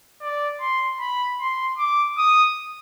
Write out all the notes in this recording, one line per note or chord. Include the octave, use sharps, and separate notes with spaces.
D5
C6
B5
C6
D6
D#6